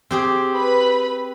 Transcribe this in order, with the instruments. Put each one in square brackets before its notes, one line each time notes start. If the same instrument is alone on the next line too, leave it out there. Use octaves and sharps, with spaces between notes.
[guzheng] C4 G4 G#4
[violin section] B4 B5